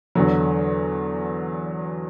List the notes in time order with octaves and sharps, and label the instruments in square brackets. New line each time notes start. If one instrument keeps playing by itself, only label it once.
[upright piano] E2 D3 F#3